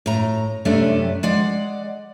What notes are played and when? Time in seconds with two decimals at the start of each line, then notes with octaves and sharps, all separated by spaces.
0.06 A2 A#5
0.65 F#2 C3 G3 A3 C#4 D4
1.23 G#3 D5 F#5